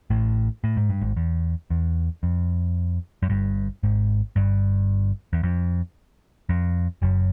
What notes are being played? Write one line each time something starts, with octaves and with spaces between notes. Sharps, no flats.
A1 A2
A2
G#2
G2
G#1 G#2
E2
E2
F2
F#2
G1 G2
G#1 G#2
G1 G2
E2
F2
F2
F#1 F#2